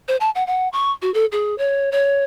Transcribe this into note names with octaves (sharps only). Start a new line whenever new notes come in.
C5
A5
F#5
F#5
C#6
F#4
A4
G#4
C#5
C#5